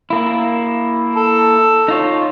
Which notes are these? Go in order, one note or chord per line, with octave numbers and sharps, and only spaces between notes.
A#3 E4
A4
D#4 F4 C#5